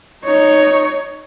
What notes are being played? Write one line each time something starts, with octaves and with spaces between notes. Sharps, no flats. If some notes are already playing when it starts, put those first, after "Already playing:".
D#4 C#5